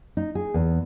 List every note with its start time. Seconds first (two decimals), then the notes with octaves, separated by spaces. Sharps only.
0.17 D#4
0.35 G#4
0.54 E2